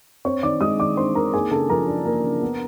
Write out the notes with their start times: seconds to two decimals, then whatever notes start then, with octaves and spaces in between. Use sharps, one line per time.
0.25 C4 C#5 C#6
0.43 D#3 D5 D6
0.61 G#3 D#5 D#6
0.79 D#3 D5 D6
0.97 C4 C5 C6
1.15 D#3 A#4 A#5
1.34 A#3 G#4 G#5
1.51 C#3 A4 A5
1.70 F3 A#4 A#5
1.88 D4
2.05 A#3
2.23 C#3
2.42 B3